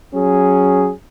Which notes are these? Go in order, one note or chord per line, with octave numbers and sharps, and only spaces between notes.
F#3 C#4 G#4